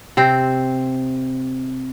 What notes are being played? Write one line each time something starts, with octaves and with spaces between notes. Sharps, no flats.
C3 C4 C5